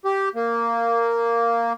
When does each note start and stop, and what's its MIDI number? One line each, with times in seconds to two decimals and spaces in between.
0.05 0.29 67
0.35 1.73 58